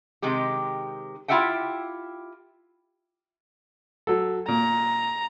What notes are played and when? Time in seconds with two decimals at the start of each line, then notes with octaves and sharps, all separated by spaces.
0.22 C3 D#3 G#3 G4
1.28 E4 F4 G4 E5 F#5 G5
4.07 F#3 A4
4.48 A#2 A#5